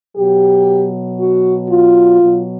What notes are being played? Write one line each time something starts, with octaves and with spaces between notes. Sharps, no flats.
B2 F#3 G4
F#4
F4
B2 F#3